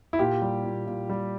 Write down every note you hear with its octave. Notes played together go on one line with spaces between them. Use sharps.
E4
A#2 G4
G3
A#2
A#2
G3